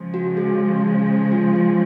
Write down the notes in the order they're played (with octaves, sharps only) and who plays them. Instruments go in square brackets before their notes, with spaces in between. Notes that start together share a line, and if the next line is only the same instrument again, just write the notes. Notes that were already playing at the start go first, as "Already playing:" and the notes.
Already playing: [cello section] C#3 F3 G#3
[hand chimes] F#4
G#4
F4
F4